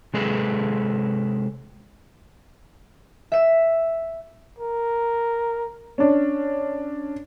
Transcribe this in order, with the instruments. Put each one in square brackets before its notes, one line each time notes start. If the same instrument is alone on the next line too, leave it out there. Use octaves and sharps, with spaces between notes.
[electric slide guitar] C3 G#3 G#4 A4 B4
[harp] E5 E7
[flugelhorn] A#4
[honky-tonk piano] C#4 D4